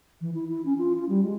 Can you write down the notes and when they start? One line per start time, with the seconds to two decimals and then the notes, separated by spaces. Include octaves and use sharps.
0.21 E3
0.35 E4
0.48 E4
0.65 C#4
0.78 F4
0.96 F4
1.09 G3
1.24 G#3